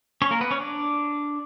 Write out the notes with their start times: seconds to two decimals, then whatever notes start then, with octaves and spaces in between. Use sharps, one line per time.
0.22 C#4 C#5
0.31 A#3 A#4
0.41 B3 B4
0.51 C#4 C#5
0.60 D4 D5